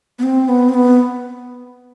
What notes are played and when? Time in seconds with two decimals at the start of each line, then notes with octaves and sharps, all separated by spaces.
0.19 B3
0.23 C4
0.49 B3
0.69 C4
0.74 B3